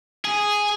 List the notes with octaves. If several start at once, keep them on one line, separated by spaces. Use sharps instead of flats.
G#4